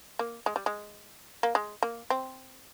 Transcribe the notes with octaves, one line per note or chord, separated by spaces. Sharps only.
A#3
G#3
G3
G#3
A#3
G#3
A#3
C4